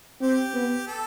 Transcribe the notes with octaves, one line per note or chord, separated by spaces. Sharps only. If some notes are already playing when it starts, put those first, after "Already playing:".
C4 G4
B3
A4